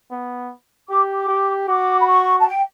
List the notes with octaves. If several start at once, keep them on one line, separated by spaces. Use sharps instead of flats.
B3
G4 D6
D6
G4
F#4 D6
B5
C#6
A5
G5